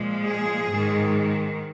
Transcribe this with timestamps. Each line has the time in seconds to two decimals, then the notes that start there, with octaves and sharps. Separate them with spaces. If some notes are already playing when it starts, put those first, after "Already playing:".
Already playing: A#2 F3 G#3
0.26 G#4
0.70 G#2 D#3 G#3